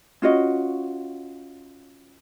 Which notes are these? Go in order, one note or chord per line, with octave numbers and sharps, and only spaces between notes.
C#4 F4 F#4 D#5